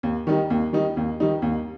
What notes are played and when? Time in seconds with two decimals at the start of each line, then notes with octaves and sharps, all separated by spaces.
0.03 D#2
0.27 D#3 G3 D#4
0.50 D#2
0.73 D#3 G3 D#4
0.97 D#2
1.20 D#3 G3 D#4
1.42 D#2